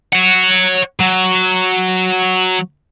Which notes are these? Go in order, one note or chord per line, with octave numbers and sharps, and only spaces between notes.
C#5 F#5
F#3